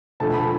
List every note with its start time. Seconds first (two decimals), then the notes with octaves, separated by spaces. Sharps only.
0.20 E1 D2 D3 F3 A3 A5
0.33 B5